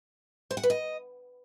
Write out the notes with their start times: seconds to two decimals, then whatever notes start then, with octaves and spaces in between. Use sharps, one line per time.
0.51 C5
0.57 F#5
0.63 B4
0.70 D#5